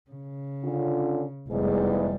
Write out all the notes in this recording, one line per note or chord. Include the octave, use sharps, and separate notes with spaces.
C#3
D3 C#4 F4
F1 E2 G#2 G3 G#3